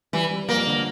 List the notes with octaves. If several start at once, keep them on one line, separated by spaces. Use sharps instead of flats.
E3 G3
G3
F2 A#3
D3